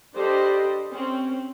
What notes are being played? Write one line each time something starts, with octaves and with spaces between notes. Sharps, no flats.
G3 D4 G4 A4 C5 D#5
C4 C#4